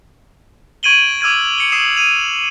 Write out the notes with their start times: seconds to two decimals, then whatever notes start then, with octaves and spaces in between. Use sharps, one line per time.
0.83 C#6 G#6 D7 D#7 F#7 G7
1.21 D6 E6 F6 G#6 D#7
1.58 C#7 F7 G7
1.72 D#6 C7 E7 F#7
1.97 D#7 F7